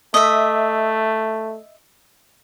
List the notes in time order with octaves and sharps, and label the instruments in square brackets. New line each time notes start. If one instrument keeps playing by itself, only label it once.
[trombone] A3 [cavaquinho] D#5 E5